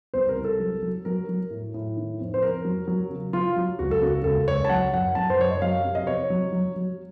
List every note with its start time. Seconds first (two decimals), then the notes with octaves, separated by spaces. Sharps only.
0.14 C2 C5
0.29 A#4
0.37 C2
0.44 A4
0.60 F#3
0.82 F#3
1.05 F#3 A#4
1.29 F#3
1.50 A2
1.74 A2
1.97 D#3
2.19 F2
2.34 C5
2.42 F2 A#4
2.65 F#3
2.88 F#3
3.10 C#3
3.33 F#3 F4
3.56 F#3
3.79 C#2 F#4
3.91 A4
4.02 C#3 F#4
4.24 C#2 A4
4.48 C#2 C#5
4.65 A5
4.70 F#3 F#5
4.93 F#2 F#5
5.15 F#2 A5
5.30 C5
5.39 F#2 C#5
5.50 D#5
5.62 F#3 F5
5.85 C3
5.95 D#5
6.07 F2 C#5
6.30 F#3
6.53 F#3
6.76 F#3